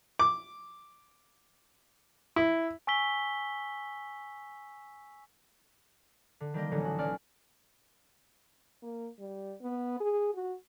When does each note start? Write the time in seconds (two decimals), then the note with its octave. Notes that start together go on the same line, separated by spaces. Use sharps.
0.19 D6
2.36 E4
2.87 G#5 C#6 E6 B6 G7
6.40 D3
6.54 D#3 G3 A#3 D#5
6.71 A1 D3 F#3 C#4 D#6
6.85 F#4
6.99 B1 C#4 D5 F6
8.82 A#3
9.19 G3
9.61 B3
10.00 G#4
10.34 F#4